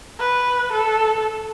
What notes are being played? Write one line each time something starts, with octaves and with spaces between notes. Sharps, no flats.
B4
A4